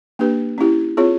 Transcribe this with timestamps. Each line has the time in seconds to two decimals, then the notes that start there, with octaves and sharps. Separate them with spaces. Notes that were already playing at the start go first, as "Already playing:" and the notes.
0.19 A#3 D4 G4 B4
0.58 C#4 E4 G4
0.97 C4 F4 G#4 C#5